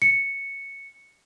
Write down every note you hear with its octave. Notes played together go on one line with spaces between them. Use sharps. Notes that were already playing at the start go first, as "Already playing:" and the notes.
C#7